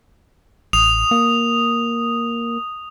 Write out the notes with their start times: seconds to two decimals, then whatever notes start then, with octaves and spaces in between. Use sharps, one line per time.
0.73 A1 D#6 F7
1.11 A#3